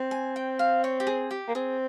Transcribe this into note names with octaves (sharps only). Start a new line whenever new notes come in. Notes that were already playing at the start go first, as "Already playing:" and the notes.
Already playing: C4
G#5
G5
F5
C#5
G4
G#4
G4
A#3
C4 G#4